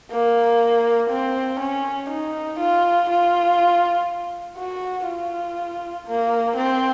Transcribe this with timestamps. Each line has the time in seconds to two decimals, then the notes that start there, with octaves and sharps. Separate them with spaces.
0.11 A#3
1.10 C4
1.60 C#4
2.10 D#4
2.59 F4
3.09 F4
4.57 F#4
5.08 F4
6.07 A#3
6.56 C4